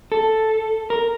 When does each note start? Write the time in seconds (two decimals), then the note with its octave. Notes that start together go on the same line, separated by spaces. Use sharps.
0.12 A4
0.90 A#4